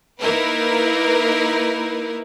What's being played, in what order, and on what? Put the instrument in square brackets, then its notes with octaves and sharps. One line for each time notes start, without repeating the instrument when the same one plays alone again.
[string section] A#3 D#4 E4 A#4 B4